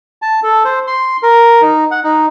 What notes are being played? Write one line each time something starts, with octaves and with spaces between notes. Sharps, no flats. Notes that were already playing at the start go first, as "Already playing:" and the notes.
A5
A4
C5
C6
A#4
D#4
F#5
D#4